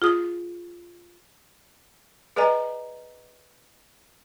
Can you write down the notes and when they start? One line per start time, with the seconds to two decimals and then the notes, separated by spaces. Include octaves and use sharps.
0.02 F4 G#4 D#6
2.36 G#4 B4 D5 D#5 G#5 A#5